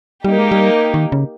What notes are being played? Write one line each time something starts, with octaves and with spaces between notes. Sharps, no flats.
G3 A#3 D#4 G4
G#3
G3
D#3
C#3